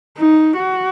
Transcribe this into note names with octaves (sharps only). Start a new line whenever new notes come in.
D#4
F#4